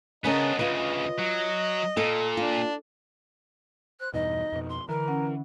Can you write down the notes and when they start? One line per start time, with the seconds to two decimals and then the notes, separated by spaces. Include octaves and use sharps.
0.24 C#3 B3 C#4 D4 A#4 D#5
0.59 D2 C#3 F4 B4
1.19 F#3
1.97 A#2 A4
2.37 D4 F4
4.00 C5 F#6
4.14 E2 G2 B2 D#4 D#5
4.52 F2 B2
4.69 C6
4.89 D3 E3 A#4 A#5
5.08 C#4 F#5